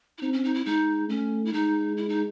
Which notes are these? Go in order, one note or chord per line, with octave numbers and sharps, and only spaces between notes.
E4
C4 D#4
C#4
D#4
E4
G#3 D#4
A3 C#4
E4
G#3 D#4
E4
D#4